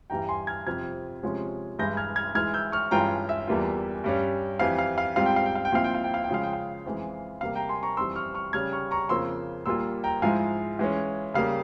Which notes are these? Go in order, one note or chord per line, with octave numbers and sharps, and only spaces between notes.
G2 E3 G3 G5 A#5
G#5 C6
F6 G#6
F2 C3 F3 C4 F6 G#6
C3 F3 G#3 C#4
G2 E3 G#3 E4 G6 A#6
F6 G#6
F6 G#6
E3 G#3 E4 F6 G#6
E6 G6
C#6 F6
G2 E3 G#3 C#4 F4 G5 A#5
E5
E2 E3 G3 A#3 F4
G2 G3 C#4
F2 E3 G3 F5
F5
F5
G#2 G3 C4 F4 F5
G5
F5
G5
F5
G5
A#2 F3 C4 E4 F5
G5
F5
G5
F5
G5
C#3 F3 G#3 F5
G5
F5
F2 E3 G#3
C3 G3 A#3 F5
G5 A#5
G#5 C6
A#5 C#6
F2 E3 G3 C6 E6
C#6 F6
C#6 F6
C#3 G3 C#4 F6 G#6
C#6 F6
A#5 C#6
F2 C#3 F3 A#3 C6 E6
A#2 G3 A#3 F4 C6 E6
G5 A#5
G#2 F3 G#3 E4 F5 G#5
E3 G#3 C#4
C#3 G3 A#3 F5